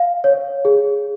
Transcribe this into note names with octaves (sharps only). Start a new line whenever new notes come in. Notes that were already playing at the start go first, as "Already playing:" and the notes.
Already playing: F5
C#5
G#4